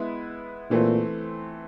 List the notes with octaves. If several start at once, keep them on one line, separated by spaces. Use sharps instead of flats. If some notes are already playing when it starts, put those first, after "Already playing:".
Already playing: G#3 B3 E4
A#2 E3 A3 C4